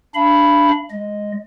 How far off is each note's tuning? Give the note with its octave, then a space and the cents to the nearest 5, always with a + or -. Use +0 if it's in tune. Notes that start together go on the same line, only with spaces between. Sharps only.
D4 +0 F5 -40 B5 +0
G#3 +0 D#5 +0